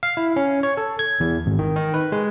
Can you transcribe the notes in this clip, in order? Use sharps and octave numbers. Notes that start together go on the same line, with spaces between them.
F5
E4
C#4
C#5
A4
G#6
E2
G#1
D#3
D#3
B4
G#3